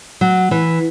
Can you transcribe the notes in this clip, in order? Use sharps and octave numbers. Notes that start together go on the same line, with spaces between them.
F#3
E3